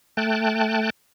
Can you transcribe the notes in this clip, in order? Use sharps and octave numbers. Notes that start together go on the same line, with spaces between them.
A3 G5 A5 F#6